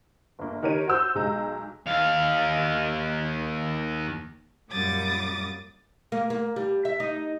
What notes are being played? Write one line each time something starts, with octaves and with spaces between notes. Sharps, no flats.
G1 A#3
D#3 G4 A#4 C#5 D#7
F#4 C5 E6 G6
B1 G#3 A#5
D#2 F5
F#2 A#2 G3 D6 D#6 A6
A#3
A#3
G3
E5
D#4